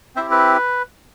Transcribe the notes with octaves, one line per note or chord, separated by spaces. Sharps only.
C4 E4 G4 C5 E5
B4